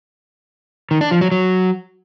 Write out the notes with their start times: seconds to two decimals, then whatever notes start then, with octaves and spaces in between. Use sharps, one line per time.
0.91 D#3
1.01 D4
1.11 F3
1.21 F#3
1.32 F#3